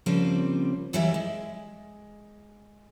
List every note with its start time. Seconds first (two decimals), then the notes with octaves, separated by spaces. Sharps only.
0.06 C#3 F3 G3 A#3 C4 C5
0.93 D#2 E3 F#3 G3 E4 E5
1.14 G#3